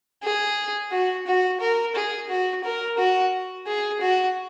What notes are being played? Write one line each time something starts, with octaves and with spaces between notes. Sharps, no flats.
G#4
F#4
F#4
A#4
G#4
F#4
A#4
F#4
G#4
F#4